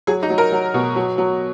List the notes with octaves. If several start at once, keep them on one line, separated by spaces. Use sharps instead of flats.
F#3 G#4
D#4
F#3
A#4
F#3
B2
F#3
F#3